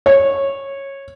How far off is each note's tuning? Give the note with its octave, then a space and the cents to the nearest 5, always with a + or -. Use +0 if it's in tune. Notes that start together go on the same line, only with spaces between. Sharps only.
C#5 -15